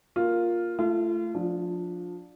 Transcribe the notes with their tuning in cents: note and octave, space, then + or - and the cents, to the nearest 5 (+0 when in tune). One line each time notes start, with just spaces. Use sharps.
A#3 +0 F4 +0
A3 +0 F4 -35
F3 +20 D4 +0